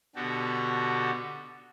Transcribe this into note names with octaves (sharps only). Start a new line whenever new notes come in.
B2 D3 F#4 G4 A4